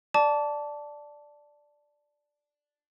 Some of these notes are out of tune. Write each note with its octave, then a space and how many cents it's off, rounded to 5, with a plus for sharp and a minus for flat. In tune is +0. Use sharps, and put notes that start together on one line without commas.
D5 +0 A5 +0 D6 -30